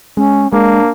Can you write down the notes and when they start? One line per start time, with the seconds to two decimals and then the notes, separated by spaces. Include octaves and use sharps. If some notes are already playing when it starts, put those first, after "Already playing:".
0.17 G#3 C#4
0.53 G#3 A#3 D4